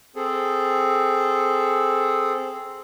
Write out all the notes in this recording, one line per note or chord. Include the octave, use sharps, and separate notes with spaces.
C4 G#4 A4